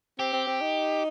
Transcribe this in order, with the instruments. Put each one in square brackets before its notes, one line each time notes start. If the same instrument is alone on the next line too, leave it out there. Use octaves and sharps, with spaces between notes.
[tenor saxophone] C4 [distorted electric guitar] G4
[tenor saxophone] C4
C4
D#4